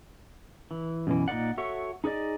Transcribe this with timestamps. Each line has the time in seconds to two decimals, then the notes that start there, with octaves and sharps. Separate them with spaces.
0.71 E3
1.07 F#2 B2 E3
1.28 A#2 D#4 B4 D5 F#5
1.58 F#4 A4 C#5 E5 F#5
2.04 D#4 G#4 B4 D5 D#5